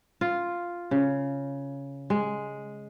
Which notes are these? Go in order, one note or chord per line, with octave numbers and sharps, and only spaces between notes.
F4
C#3
G#3